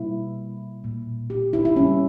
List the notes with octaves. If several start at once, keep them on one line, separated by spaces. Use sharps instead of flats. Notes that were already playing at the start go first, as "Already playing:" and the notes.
Already playing: B2 G3 A#3 E4
A#2 A#3
G4
E4
E4
C#3 G3 A#3 C#4